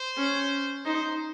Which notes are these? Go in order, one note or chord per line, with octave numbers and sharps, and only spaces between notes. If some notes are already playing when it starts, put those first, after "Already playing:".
Already playing: C5
C#4
D#4 C5